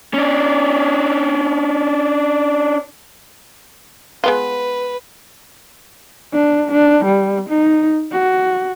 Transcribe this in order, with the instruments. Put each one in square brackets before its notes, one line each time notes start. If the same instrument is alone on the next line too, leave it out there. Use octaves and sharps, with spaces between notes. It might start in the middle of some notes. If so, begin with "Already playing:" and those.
[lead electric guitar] C#4 D4
[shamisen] G#3 B3 F4 [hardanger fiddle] B4
[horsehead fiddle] D4
D4
G3
D#4
F#4